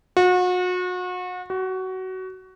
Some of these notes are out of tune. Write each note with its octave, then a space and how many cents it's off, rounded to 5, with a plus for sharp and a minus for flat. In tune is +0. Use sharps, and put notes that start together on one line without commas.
F#4 -35
F#4 +20